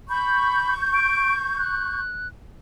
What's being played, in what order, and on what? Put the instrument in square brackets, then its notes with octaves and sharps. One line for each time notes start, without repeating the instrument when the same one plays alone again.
[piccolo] B5 [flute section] C#6 G6
[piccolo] D7
F#6